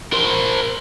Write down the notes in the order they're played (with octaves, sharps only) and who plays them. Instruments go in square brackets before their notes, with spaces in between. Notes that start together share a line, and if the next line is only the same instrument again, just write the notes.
[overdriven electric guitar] A#4 C5